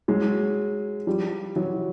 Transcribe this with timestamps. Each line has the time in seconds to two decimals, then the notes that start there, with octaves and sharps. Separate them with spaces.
0.08 F#3 G#3
1.07 F3 G3
1.56 E3 F#3